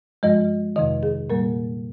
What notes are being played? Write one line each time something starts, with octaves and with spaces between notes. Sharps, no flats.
G2 F3 G#3 D#5
F2 C3 D#3 D#5
G#4
A#2 G3 A#3 A#4